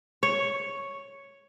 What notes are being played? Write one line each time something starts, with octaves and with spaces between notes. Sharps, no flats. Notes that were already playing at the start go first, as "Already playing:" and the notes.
C#5